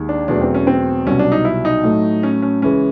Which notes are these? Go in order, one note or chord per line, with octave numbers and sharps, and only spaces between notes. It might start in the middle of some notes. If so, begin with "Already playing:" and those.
Already playing: D#2 D#3 G#3
D4
E2 B2 F#3 A3 D4
C4
C#4
C4
C2 B2 F#3 C#4
D4
D#4
E4
D#4
A2 F#3 A3
C#4
C#4
C#2 C#3 E3 G#3 C#4